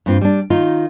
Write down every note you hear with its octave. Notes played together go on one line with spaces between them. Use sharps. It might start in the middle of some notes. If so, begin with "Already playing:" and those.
G2 C4 F4
G3 D4
D#3 D#4 F4